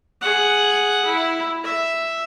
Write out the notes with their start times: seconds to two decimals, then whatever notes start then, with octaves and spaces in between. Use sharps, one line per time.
0.21 G#4 F#5
1.05 E4
1.64 E5